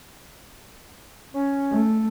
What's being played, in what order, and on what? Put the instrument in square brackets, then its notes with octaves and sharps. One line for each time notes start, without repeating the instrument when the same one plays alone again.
[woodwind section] C#4
[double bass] A3